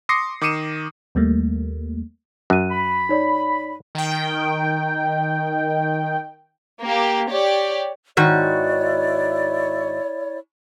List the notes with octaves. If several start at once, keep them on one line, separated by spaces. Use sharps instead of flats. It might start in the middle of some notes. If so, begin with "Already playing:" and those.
C6 D6 D#6 A#6 C7 C#7
D#3 D6 D#6 C#7 D#7 E7
D#2 G3 A3 A#3
F#2 F#6 D#7
B5
D#4 C#5 D5
D#3 G5
A#3 G4
G4 C#5 D5
G#2 D#3 E4 F#4 C#5 D5